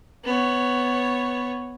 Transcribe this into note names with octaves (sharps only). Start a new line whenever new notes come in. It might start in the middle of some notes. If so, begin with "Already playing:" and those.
B3 C#5